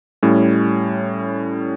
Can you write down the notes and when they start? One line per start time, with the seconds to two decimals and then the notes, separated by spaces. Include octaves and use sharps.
0.23 A2 G3 C#4